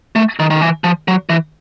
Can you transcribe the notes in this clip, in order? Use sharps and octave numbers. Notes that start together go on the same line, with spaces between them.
A3
D#3
D#3
E3
F3
F#3
E3